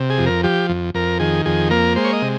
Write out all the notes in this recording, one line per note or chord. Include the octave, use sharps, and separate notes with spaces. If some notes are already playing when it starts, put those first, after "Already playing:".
Already playing: C3
G#4
F2
A#4
F3 G4
F2
F2 A#4
D#3 G#4
F2 G#4
A#3 A#4
G#3 C5
C#5
D#5
C3